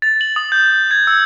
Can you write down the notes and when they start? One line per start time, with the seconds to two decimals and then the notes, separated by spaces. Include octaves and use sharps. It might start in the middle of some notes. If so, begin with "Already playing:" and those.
0.02 A6
0.21 F#7
0.36 D#6
0.52 G6
0.91 G#6
1.07 E6